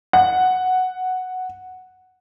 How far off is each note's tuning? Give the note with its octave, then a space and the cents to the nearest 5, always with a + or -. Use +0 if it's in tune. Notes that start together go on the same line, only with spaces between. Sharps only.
F#5 +0